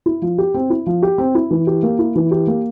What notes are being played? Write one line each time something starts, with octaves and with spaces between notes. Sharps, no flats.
E4
F3
G4
C4
E4
F3
G4
C4
E4
E3
G4
A#3
E4
E3
G4
A#3